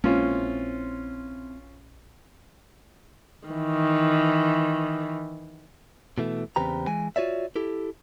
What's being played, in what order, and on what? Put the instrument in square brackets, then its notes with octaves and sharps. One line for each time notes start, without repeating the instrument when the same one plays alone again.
[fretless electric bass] A#1 G#3 A#3 [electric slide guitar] C4 E4 C5 [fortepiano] C#4 F4
[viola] D#3 E3
[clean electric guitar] B2 E3 A3
E2 C#3 C4 G4 B4 A#5
E3 G#3 G#5
F4 F#4 C#5 D5 E5
E4 G4 A4